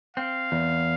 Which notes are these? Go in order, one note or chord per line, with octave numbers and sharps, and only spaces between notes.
C4 F5
E2